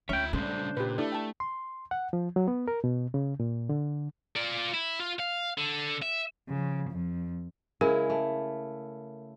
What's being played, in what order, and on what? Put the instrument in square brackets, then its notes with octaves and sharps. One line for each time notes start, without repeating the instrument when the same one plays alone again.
[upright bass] D2 [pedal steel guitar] C#4 G5 [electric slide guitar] F4 E5
[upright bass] C#3 [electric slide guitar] G3 A3 C#4 [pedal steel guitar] D4 C5
[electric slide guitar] A#2 [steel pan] G4 B4
[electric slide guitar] A3 [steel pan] D4 E4 A4
[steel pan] G5 A5
[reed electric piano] C6
F#5
F3
F#3
B3
A#4
B2
C#3
A#2
D3
[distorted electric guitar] F4 D5
E4
F4
F5
D3
E5
[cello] C#3 F3
F2
[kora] C#3 G#3 E4 [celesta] A#4
[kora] A3